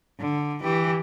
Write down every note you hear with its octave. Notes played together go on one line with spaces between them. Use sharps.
D3
E3 G4